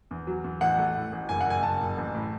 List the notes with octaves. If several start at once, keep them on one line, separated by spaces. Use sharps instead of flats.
E2
F#3
E2
A1 F#5
A3
A2
A1
F#1 G#5
F#5
F#1 G#5
F#1 A5
F#1
A1
A2